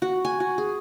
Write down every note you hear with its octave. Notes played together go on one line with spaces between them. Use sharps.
F#4
G#5
F#4
G#4